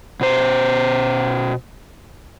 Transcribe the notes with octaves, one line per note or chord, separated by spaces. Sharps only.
B2 C5